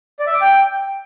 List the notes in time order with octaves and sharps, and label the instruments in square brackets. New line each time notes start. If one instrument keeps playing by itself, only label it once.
[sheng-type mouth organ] D5
E5
D6
G5